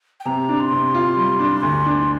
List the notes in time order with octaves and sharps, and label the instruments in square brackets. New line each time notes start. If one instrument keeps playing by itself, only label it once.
[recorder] G5
[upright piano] C3 [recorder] A#5
[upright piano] D4
[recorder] C6
[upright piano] C3
F4
G3
D4
D2
D4